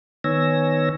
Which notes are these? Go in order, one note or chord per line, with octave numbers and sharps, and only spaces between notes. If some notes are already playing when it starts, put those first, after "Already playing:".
D#3 B3 C#5 G#5 E6 A#6